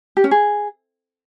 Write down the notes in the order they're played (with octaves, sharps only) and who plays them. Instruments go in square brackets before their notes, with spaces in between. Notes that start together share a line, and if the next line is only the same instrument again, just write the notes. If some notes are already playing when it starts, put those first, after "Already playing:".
[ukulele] G4
C#4
G#4